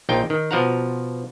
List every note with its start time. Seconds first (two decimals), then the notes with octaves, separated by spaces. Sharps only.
0.09 A#1 D#4 F4 G5
0.30 D#3
0.51 B2 F3 F5 F#5 A#5